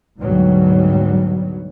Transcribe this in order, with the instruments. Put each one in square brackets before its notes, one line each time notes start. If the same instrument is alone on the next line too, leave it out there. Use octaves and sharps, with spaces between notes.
[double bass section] D2 G#2 B2 F#3 G3